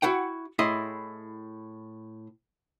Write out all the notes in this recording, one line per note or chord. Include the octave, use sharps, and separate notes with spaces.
E4 F#4 F#5 G5
A2 E4 G#4 D#5 C6